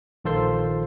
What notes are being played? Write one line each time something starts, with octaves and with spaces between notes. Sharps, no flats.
A#1 D#3 F4 A4 C5 C6